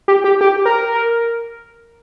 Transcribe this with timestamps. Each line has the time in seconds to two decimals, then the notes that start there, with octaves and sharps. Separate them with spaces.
0.08 G4
0.24 G4
0.41 G4
0.65 A#4